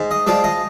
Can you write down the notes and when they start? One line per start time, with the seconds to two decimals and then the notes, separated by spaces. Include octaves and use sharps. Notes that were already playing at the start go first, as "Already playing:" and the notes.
Already playing: G#2
0.11 D#5
0.27 F3 G#3 D5
0.44 D#5